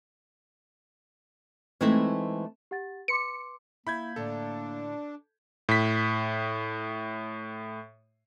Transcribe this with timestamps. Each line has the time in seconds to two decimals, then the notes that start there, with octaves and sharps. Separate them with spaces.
1.81 E3 G#3 A3 C4 D#4 E4
2.71 G4 F#5 A6
3.08 B4 C6 D6 C#7
3.87 A#3 E4 B5 G6 G#6
4.16 A2 D3 D4 A4
5.69 A2 B6